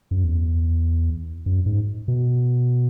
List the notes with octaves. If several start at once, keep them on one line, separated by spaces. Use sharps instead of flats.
F#2
E2
F#2
G#2
B2